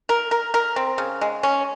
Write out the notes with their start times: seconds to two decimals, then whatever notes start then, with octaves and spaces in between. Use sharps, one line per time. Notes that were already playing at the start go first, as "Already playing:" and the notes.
0.09 A#4
0.31 A#4
0.54 A#4
0.76 C4
0.98 C#3
1.21 G#3
1.43 C#4